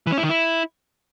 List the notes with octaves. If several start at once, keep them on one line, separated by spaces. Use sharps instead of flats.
E3
C#4
E4
D#3
E4